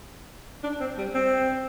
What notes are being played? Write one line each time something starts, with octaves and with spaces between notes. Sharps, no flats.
D4
C4
G3
C4